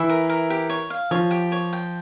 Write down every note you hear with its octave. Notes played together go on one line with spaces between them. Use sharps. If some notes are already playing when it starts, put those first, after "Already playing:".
Already playing: E3 E4 E5
A#4
A#4
G4
C#5
F5
F3 F4 C#5
G4
C#5
G5